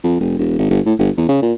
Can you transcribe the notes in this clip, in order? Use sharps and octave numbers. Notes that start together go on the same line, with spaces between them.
F2
F1
E1
G#1
G1
A2
G1
E2
C#3
A#2